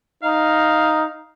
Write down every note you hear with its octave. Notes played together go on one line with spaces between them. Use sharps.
D#4 F5